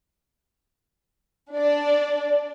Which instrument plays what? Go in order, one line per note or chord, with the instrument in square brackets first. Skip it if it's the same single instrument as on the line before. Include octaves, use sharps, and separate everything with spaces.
[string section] D4 D5